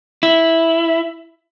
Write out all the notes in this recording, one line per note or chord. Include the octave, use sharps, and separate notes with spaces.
E4